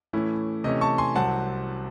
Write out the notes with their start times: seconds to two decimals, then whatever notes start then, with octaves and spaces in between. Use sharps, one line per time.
0.13 A2 E3 A3 C#4 E4
0.64 C3 E3 A3 C#4 D#5
0.81 A5 C#6
0.98 G#5 C6
1.15 C2 C3 F#3 C4 F#5 A5